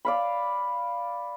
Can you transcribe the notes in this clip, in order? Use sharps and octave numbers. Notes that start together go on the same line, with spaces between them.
D5 F5 B5